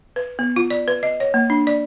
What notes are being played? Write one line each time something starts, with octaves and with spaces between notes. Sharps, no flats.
B4
B3
F4
D5
B4
D#5
C#5
A#3
D4
D5